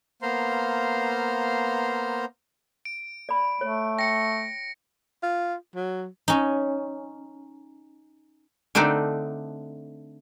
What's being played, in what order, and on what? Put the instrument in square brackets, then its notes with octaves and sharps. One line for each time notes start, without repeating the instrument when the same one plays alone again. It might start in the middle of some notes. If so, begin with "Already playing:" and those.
[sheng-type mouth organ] A#3 B3 C5 F5 A#5 C6
[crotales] D7
[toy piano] D5 B5
[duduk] A3 [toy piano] C#5
[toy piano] G5 [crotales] A#6 C#7
[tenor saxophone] F4
F#3
[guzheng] C#4 D#4
[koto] D3 A3 C4 D4 D#4